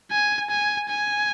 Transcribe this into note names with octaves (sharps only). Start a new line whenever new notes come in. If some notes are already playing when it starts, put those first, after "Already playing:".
G#5
G#5
G#5